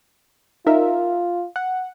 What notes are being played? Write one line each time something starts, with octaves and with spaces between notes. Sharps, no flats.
D#4 F4 A#4 E5
F#5